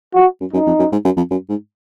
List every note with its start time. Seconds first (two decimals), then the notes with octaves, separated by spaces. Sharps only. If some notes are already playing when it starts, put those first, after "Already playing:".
0.14 F3 F#4
0.40 F#2
0.53 F#2 D#4
0.67 F2
0.79 F#2
0.92 G#2
1.05 F#2
1.17 F2
1.30 F#2
1.49 G#2